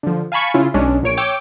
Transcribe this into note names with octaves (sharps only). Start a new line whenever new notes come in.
D3 F3
F5 G#5 A5 B5 C#6
C#3 E4 F4
B1 G#3 C#4 D4
A#1 A#2 C#5 D7
C#5 G5 D6 E6